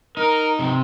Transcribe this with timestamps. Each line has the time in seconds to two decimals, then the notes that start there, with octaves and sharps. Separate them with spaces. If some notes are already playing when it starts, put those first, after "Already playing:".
0.17 D#4 A#4
0.59 C3